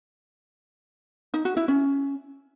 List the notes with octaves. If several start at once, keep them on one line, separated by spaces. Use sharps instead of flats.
D#4
F#4
E4
C#4